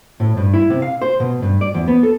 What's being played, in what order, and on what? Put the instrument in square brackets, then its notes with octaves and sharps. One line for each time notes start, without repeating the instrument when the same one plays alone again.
[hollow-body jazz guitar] A2
G2
E4
C3
F5
C5
B2
G2
D5
E2
B3
A4